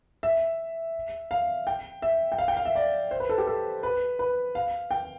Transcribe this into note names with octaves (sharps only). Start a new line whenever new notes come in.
E5
F5
G5
E5
G5
F5
G5
F5
E5
D5
C5
B4
A4
G4
A4
B4
B4
F5
G5